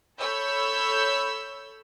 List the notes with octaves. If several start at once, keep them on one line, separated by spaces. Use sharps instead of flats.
A4 C#5 B5 E6 G6